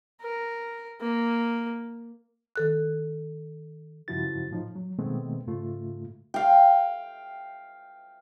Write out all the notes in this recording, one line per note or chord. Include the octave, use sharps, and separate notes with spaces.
A#4
A#3
D#3 A4 F#6
G2 C#3 F3 E4 F#4 A6
A2 F3 D#4
F#3
B2 D#3 G#3 A3 B3 C4
G#2 C#3 A3 F4
F5 G5